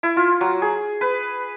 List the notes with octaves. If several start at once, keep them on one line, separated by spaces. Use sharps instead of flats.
E4
F4
F#3
G#4
B4